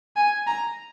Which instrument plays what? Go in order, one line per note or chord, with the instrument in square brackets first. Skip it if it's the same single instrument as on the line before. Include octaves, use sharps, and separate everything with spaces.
[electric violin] G#5
A#5